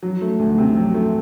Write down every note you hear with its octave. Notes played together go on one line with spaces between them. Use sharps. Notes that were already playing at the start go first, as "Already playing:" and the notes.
F#3
A3
D2
C3
F#3
A3